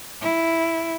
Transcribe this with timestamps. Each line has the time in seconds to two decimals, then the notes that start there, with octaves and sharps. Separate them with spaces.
0.21 E4